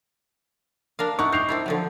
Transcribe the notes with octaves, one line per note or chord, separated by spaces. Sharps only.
D4 A#4 F5
D#4 E4 F#5 C#6
D#4 G4 G6 C7 F7
C4 D4 E4
D3 F3 F#3